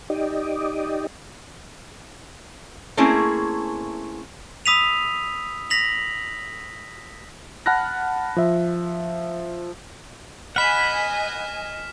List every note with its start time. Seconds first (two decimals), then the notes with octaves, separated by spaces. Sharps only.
0.10 D#4 G4 D5 D#5
2.97 A3 A#3 C4 C#4 E4 G#4
4.66 B5 D#6 E6 B6 D#7 F7
5.70 A#6 B6 F7 F#7
7.66 F#5 A5 B5 F6 F#6 A#6
8.36 F3 E5
10.56 D#5 F#5 G#5 B5 F6 B6 E7